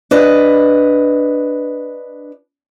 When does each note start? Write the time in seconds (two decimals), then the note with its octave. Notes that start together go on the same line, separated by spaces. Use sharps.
0.11 D4 B4 D#5